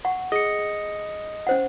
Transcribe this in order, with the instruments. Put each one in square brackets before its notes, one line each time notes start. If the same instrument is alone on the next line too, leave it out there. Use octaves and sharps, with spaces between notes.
[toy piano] F#5 C#6
[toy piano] G#4 [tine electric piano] D#5 C#7
[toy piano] C#4 C5 F#5